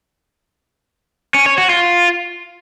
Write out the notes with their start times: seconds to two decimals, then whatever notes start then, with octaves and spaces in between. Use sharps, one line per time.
1.34 C#4
1.46 C#5
1.58 F#4
1.70 F4